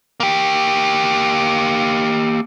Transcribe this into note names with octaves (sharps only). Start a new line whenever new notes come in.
A#3 G4